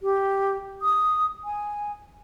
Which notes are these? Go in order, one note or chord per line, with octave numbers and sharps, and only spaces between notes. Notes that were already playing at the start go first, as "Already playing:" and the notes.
G4
D#6
G#5